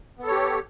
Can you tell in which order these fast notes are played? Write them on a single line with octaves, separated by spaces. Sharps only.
B3 A4 C#5 G4